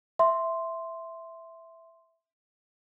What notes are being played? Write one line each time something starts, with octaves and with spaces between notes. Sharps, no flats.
E5 C6